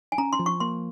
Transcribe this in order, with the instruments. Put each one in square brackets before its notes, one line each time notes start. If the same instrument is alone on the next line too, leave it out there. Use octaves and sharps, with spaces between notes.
[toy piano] G#5
[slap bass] C#4 [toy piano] A#5
[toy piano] C6
[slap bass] F3
[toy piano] C#6
[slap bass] A#3 [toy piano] C6